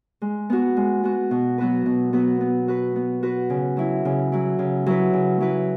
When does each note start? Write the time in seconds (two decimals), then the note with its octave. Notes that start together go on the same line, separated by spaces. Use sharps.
0.22 G#3
0.50 B3 F#4
0.77 G#3
1.03 B3 F#4
1.31 B2
1.58 F#3 B3 F#4 B4
1.86 B2
2.13 F#3 B3 F#4 B4
2.41 B3
2.68 F#4 B4
2.96 B3
3.23 F#4 B4
3.50 C#3
3.77 F#3 E4
4.05 C#3
4.32 F#3 E4
4.59 C#3
4.86 F#3 E4 B4
5.13 C#3
5.41 F#3 E4 B4